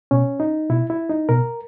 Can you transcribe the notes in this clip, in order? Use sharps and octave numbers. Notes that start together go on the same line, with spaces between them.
B2 C#4
D#4
B2 E4
E4
D#4
B2 A#4